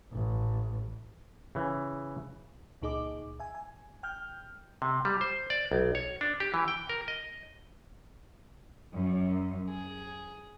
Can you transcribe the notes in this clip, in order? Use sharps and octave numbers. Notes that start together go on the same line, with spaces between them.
A1
C#3 E3
C#2 A#2 D#4 G#4 D#5 D6
E5 G#5
G#5
G5 F6 G6
C3
G3
C5
D5
B1
C#5
D4
G4
E3
G5
A#4
D#5
F#2
G#4